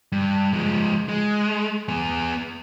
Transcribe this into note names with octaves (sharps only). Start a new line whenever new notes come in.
G2
F3 G#3
G#3
B3 G#4